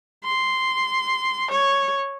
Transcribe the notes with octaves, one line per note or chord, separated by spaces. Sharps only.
C6
C#5